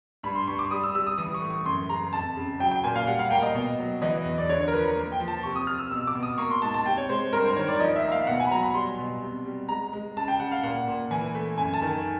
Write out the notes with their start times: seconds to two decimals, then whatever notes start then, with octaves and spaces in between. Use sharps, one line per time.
0.23 G2 B5
0.35 C6
0.47 G2 C#6
0.59 D6
0.71 G3 D#6
0.83 E6
0.95 G3 E6
1.07 D#6
1.18 E3 D#6
1.34 C#6
1.42 A2
1.50 C#6
1.66 F#2 C6
1.89 C#3 A#5
2.13 F2 A5
2.37 C#3
2.60 F#3 G5
2.71 G5
2.84 A#2 G#5
2.96 F5
3.07 G3 F#5
3.19 F5
3.31 A#3 G5
3.42 D#5
3.55 B2
3.79 F#3
4.02 E3 D#5
4.25 E2
4.38 D5
4.49 D3 C#5
4.61 C#5
4.68 A#4
4.73 F3 B4
4.84 A#4
4.96 A#3
5.12 G5
5.20 F3
5.28 A5
5.43 C3 C#6
5.56 D#6
5.67 C3 F6
5.79 E6
5.92 B2 E6
6.07 D6
6.15 B2
6.23 D#6
6.38 A#3 C#6
6.51 C6
6.62 G#2 A5
6.74 A5
6.86 C3 G5
6.97 C#5
7.09 G#3 C5
7.32 G2 A#4
7.45 C5
7.56 D#3 C#5
7.68 D5
7.79 F3 D#5
7.96 E5
8.04 A#3
8.12 F5
8.27 B2 F#5
8.40 G#5
8.45 B5
8.51 F#3 A#5
8.63 B5
8.74 G3 C6
8.99 B2
9.22 C3
9.45 G3
9.69 G#3 A#5
9.93 G#3
10.17 C#3 A5
10.28 G5
10.40 C#3 F#5
10.51 F5
10.63 A#2 F#5
10.88 A#2
11.11 E3 G#5
11.35 A3
11.58 F#2 G#5
11.74 A5
11.82 D#3